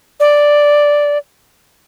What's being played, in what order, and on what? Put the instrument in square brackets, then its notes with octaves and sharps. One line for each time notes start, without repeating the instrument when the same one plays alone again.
[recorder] D5